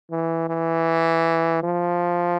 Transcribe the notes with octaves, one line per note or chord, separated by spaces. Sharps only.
E3
E3
F3